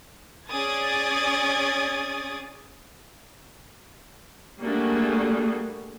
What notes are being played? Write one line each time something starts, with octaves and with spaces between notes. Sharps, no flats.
C#4 G#4 D5 D#6 G#6 A6
G3 A3 A#3 D4 F#4 G#4